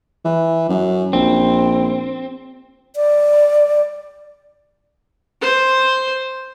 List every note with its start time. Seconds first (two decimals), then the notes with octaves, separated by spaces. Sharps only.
0.25 E3
0.69 F#2
1.13 A#1 C4
2.96 D5
5.41 C5